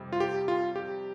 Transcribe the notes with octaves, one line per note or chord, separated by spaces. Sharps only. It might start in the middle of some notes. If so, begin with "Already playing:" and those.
Already playing: F2 C3 G3
F4
G4
F4
G4